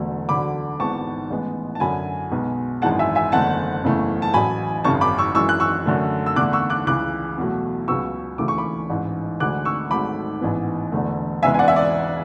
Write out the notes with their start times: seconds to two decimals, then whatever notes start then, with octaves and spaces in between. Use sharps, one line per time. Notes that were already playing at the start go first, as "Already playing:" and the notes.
Already playing: E1 E2 D3 F#3 A3
0.29 D2 D3 F#3 B5 D6
0.80 G#1 G#2 E3 B3 A5 C#6
1.30 A1 A2 G#3 B3
1.75 A5
1.80 F#2 D3 F#3 G#5 B5
2.31 B1 B2 G#3 B3
2.82 G#1 F#2 E3 G#3 F#5 A5
2.99 E5 G#5
3.15 E5 G#5
3.32 F#1 E2 D3 A3 F#5 A5
3.83 F#1 E2 C#3 E3 A3
4.22 A5
4.34 A1 A2 F#3 G#5 B5
4.84 G#1 F#2 C#3 A5 C#6
5.01 B5 D6
5.18 C#6 E6
5.35 F#2 E3 G#3 C#6 E6
5.49 F#6
5.60 C#6 E6
5.86 F#2 D3 A3
6.26 E6
6.36 E2 D3 A3 D6 F#6
6.53 C#6 E6
6.70 D6 F#6
6.86 C#2 C#3 E3 D6 F#6
7.38 E2 B2 F#3 A3
7.88 C#2 C#3 F#3 B3 C#6 E6
8.38 E1 D2 C#3 E3 A3 D6
8.48 C#6
8.58 B5 D6
8.90 A1 G#2 E3
9.40 D2 D3 G#3 D6 F#6
9.65 C#6 E6
9.91 G#1 G#2 F#3 A3 B5 D6
10.41 A1 G#2 E3 B3
10.92 E1 E2 D3 A3
11.43 E1 E2 C#3 G#3 B3 E5 G#5
11.54 G#5
11.59 D5 F#5
11.68 E5
11.76 D5